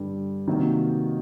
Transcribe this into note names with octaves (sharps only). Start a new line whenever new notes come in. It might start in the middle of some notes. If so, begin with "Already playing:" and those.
Already playing: G2 D3 G3
C3 D#3 F#3 A#3 D#4